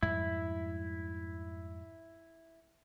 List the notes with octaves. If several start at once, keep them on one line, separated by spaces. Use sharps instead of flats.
F2 G#2 G3 E4